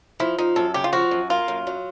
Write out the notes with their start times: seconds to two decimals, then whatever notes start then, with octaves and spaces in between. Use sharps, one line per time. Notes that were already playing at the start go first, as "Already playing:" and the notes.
0.20 F3 E4
0.38 F3 D#4
0.56 F#2 A4
0.74 C#3 G4
0.84 F4
0.93 F3 F#4
1.11 F#2
1.30 A#3 F4
1.48 F#2
1.67 F#3